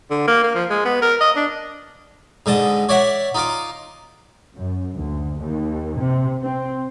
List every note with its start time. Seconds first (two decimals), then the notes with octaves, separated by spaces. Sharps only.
0.11 D3
0.28 A#3
0.44 A#3
0.55 F3
0.70 G#3
0.85 B3
1.02 A#4
1.21 D#5
1.36 D4
2.46 G#2 D3 D#5 A5
2.89 C#5 D5 E5 F#5
3.35 D#4 F4 D6
4.55 F#2
4.96 D2
5.39 D#2
5.98 C3
6.43 C4